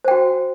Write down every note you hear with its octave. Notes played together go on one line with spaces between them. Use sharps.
F#4 C5 G5